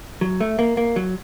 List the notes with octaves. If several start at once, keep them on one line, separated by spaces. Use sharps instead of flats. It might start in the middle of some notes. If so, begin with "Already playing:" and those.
F#3
A3
A#3
A#3
F#3